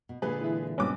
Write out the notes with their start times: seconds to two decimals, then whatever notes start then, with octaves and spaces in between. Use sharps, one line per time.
0.09 B2
0.22 A#2 D3 G#3 G#4 B4
0.41 E3 E4
0.78 F#1 G2 A#2 B3 C#4 D6